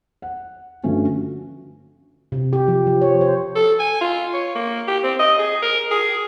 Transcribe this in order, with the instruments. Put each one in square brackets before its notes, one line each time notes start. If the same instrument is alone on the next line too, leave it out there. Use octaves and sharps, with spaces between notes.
[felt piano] F#5
G2 D3 F3 A3 C#4 F#4
[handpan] C3
G4
F3
F3
C#5
C5
[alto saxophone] A4
G#5
F4
C#5
A#3
G4
C4
D#5
G#4
A#4
G#4